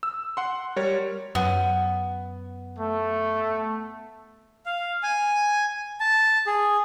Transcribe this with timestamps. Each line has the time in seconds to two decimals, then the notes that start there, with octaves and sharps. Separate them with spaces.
0.03 E6
0.37 F#5 C6
0.76 G3 A#4 C#5
1.35 F#2 B3
2.79 A3
4.66 F5
5.03 G#5
6.00 A5
6.47 G#4